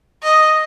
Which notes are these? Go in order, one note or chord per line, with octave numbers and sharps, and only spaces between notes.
D#5